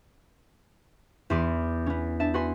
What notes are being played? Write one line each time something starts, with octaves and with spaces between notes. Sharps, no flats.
E2 E4 C6 D6 D#7
B3 C#4
D4 E5 A5
F#4 B4 F#5 G#5 C6